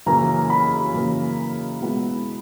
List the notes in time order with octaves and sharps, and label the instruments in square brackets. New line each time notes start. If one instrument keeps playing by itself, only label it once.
[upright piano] F#2 C#3 E3 A#3 C#4 [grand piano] A#5
[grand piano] B5
[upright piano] F#2 C#3 E3 A#3 C#4
B2 G#3 B3 E4